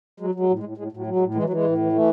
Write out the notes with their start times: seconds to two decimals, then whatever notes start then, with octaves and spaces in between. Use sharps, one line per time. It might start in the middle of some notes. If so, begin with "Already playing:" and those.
0.20 F#3 G#3
0.35 F#3
0.40 G#3
0.49 A2
0.59 G#3
0.63 A2
0.78 A2 G#3
0.92 A2 F#3
1.06 F#3
1.16 G#3
1.20 A2
1.34 E3 G#3
1.43 F#3
1.49 E3 G#3
1.64 A2
1.78 E3
1.92 E3 A3